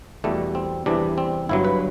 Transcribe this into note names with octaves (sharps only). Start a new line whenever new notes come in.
E2 B2 G3 A3
C4
E2 C3 E3 G3 D4
C4
G1 G2 F#3 E4
B4